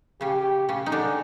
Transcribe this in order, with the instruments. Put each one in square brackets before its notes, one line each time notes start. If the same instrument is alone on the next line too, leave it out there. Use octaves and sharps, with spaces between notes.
[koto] C#3 C#4 [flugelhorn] G4
[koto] C#3 C#4 [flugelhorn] G#4
[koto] D#4
D3 D4